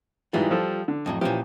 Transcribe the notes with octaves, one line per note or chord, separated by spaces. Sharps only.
G#2 E3 G3 G#3 F4
F3 A4
D3
F2 A2 F#3
A#2 E3 F3 C#4 G4